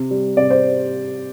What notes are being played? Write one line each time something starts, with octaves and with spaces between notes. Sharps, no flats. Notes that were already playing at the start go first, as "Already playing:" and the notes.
Already playing: C3
G3
C3 D5
C5